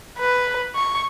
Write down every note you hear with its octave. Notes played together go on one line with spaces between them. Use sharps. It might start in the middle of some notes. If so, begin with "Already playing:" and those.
B4
C#6